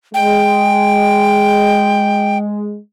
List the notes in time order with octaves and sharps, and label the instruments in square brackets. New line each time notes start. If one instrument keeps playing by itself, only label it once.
[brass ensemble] G#3 [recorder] G5